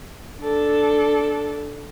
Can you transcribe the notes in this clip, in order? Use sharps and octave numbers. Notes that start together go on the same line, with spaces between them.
D4 A4